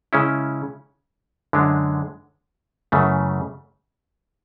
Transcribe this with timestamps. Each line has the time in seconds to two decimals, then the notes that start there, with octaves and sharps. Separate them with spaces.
0.13 C#3 G#3 C#4 E4
1.53 F#2 D3 G#3 D4
2.92 F#2 C#3 E3 A3